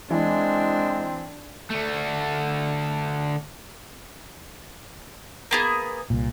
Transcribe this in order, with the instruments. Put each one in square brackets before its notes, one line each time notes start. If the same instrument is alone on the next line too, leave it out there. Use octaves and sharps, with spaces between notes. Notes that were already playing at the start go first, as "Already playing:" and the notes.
[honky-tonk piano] E3 [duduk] G#3 [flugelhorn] C4 [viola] D4
[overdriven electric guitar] D3 A3
[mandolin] A#3 B3 G#4
[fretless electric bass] C2 A#2